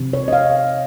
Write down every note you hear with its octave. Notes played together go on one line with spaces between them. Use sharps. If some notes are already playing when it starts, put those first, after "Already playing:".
Already playing: C3 F3 C4
C#5
D#5
F5